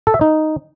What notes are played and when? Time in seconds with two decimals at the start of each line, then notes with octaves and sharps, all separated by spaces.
0.07 A4
0.14 E5
0.21 D#4